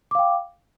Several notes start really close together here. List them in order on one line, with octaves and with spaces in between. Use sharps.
D6 F5 G5